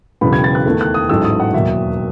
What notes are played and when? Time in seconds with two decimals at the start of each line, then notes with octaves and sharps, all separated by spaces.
0.21 E1 E2 C#3 F#3 B3 B5
0.33 G#6
0.44 A6
0.55 F#6
0.66 E2 D#3 A3
0.81 F#6
0.94 D#6
1.09 A1 G#2 F#3 A3 E6
1.24 D#6
1.40 F#5
1.53 E1 D#2 D#3 F#3 E5